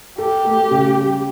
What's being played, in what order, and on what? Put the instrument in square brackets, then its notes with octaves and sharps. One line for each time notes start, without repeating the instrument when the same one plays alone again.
[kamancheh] G4 [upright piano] A4
[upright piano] A3
C#3
G3